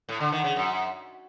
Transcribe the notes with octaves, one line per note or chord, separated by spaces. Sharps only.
A2
D3
D#3
C#3
F#2